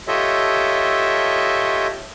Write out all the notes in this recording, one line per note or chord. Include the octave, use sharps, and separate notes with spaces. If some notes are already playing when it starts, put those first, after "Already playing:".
F4 G4 A4 C#5 D#5 E5